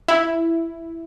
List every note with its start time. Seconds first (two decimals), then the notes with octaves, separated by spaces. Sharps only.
0.08 E4